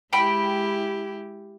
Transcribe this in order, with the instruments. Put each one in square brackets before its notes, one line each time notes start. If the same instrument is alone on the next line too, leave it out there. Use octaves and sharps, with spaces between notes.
[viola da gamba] G#3 E4 G4 [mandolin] G5 B5